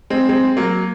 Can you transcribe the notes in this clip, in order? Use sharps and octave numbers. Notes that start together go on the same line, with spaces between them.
G#3 C4
G#3 C4
F#3 A#3